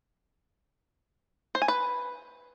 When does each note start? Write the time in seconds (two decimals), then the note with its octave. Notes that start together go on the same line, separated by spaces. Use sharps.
1.55 C5
1.62 G#5
1.68 B4